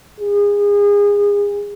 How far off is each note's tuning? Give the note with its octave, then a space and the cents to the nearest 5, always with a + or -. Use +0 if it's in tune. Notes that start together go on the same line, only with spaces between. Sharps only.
G#4 -30